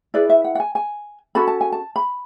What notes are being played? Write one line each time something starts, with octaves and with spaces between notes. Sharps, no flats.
E4 G#4 B4 D5
E5
F#5
F#5
G#5
G#5
C#4 F#4 A4 B5
A5
G#5
A5
B5